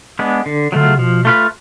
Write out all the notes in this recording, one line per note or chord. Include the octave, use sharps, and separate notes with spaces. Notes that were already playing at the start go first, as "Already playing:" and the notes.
G#3 B3 D4
D3
D3 F#3 A3 F4
C#3
B2 F3
A3 F4 B4